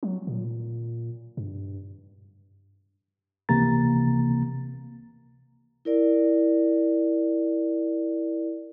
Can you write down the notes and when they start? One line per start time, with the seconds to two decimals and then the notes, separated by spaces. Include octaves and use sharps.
0.03 F#3
0.27 A#2
1.37 G2
3.49 C#2 C3 E3 A#3 A#5 A6
5.85 E4 A#4 D5